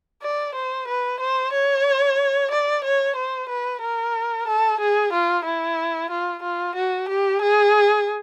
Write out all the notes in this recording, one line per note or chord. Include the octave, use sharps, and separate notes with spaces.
D5
C5
B4
C5
C#5
D5
C#5
C5
B4
A#4
A4
G#4
F4
E4
F4
F4
F#4
G4
G#4